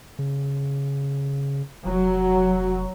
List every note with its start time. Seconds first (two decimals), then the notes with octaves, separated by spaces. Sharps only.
0.19 C#3
1.86 F1 F#3